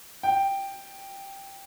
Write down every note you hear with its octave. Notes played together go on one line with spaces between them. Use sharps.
G5